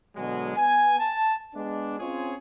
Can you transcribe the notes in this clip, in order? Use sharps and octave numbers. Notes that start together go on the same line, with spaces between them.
B2 D3 F#3 G#3
B3 G#5
A5
G#3 B3 D4
C4 C#4 F4 G#4 C#5